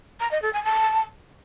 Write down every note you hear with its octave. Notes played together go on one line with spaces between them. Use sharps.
A#5
D#5
A4
G#5
A5